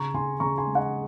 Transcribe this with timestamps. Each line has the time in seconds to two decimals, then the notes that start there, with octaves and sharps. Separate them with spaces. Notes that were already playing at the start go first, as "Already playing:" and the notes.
Already playing: C#3 A#5 C#6
0.14 C#3 G#5 C6
0.40 C#3 A#5 C#6
0.58 G#5 C6
0.66 G#3
0.75 D#5 F#5